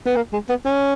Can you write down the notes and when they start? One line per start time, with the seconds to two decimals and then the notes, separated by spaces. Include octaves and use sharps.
0.06 B3
0.16 A#3
0.33 G#3
0.49 B3
0.65 C#4